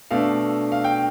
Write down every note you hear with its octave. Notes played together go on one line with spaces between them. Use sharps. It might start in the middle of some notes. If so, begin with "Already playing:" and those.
B2 A3 D4 F5
F5
G5